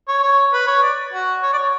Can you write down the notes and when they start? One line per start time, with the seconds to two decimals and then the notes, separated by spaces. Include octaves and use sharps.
0.08 C#5
0.23 C#5
0.53 B4
0.67 C#5
0.82 D5
1.13 F#4
1.42 C#5
1.53 D5
1.58 C#5